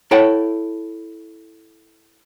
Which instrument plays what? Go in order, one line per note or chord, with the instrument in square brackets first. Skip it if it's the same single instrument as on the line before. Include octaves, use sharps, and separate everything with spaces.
[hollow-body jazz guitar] E4 A4 C#5 F#5 G5 A5